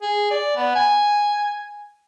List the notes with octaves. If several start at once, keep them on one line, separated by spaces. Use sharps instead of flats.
G#4
D5
B3
G#5